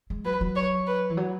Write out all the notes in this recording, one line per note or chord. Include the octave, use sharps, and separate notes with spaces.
G#3
F#3 B4
F#3
C#5
B4
E3
F#3